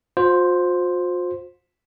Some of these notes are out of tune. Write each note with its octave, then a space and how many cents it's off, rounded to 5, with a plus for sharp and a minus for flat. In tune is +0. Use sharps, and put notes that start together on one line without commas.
F4 +45 C5 +0